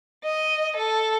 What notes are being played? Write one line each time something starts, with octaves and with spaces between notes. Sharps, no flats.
D#5
A4